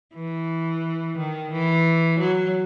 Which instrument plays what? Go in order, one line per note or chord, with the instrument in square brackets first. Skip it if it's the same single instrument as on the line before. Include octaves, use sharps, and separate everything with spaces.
[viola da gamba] E3
D#3
E3
F#3